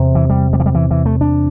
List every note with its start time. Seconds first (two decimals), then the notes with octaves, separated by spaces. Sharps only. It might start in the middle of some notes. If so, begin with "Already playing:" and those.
Already playing: E2 C3
0.15 E3
0.30 G3
0.53 G3
0.60 E3
0.66 G3
0.75 E3
0.91 E3
1.06 A3
1.21 D4